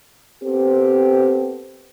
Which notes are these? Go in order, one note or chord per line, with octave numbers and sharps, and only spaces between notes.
B3 C4 G4 A4 C5